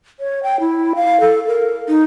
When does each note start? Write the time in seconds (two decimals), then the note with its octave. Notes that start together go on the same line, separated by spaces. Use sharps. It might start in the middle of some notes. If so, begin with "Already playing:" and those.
0.20 C#5
0.43 G5
0.60 E4
0.96 F5
1.21 A4
1.47 A#4
1.88 D#4